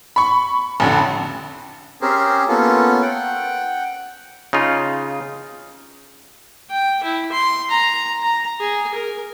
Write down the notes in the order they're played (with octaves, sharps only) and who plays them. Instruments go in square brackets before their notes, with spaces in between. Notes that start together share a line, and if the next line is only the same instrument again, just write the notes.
[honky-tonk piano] B5 C#6
A1 F2 D3
[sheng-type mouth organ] C4 C#4 G4 G#4 A#4 C5
A#3 B3 C#4 F4 A4
F#5 G5
[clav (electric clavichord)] C#3 D#4 F4
[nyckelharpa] G5
E4
C6
A#5
A#5
G#4
A#4